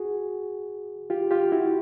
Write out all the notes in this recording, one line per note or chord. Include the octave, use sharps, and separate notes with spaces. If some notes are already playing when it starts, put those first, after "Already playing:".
Already playing: F#4 G#4
F4 G4
F4 G4
E4 F#4